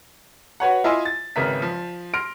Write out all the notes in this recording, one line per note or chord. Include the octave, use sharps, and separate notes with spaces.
F#4 B4 C#5 F#5
E4 F4 D#5 E5 G#5 C6
A6
G#1 C#3 A#4 B4 E5 B6
F3
C6 F6 A#6 D7